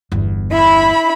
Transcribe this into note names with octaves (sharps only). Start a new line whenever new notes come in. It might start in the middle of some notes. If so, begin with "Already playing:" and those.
G1 E2
E4 B5